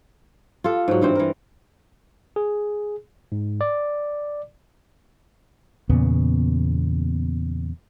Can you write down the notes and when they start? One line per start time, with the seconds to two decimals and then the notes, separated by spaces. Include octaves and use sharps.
0.64 F4 G4 A4
0.88 G#2 F#3
1.01 G2 E3 C4 C5
1.15 E3 A#4
2.36 G#4
3.32 G#2
3.61 D5
5.89 E2 A#2 C#3 B3